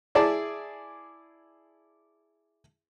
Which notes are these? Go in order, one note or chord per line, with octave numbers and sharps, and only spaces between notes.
E4 G#4 D5 A5